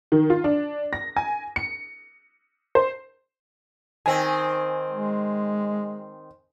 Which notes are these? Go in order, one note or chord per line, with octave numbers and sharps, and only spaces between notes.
D#3
F4
D4
A#6
G#5
C#7
C5
D#3 C4 G#5
G#3